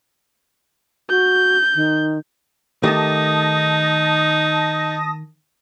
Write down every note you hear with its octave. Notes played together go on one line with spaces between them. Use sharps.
F#4 G6
D#3
D#3 A3 D#4 G4 A5 D#6 A#6